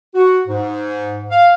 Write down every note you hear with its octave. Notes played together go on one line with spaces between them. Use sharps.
F#4
G#2
F5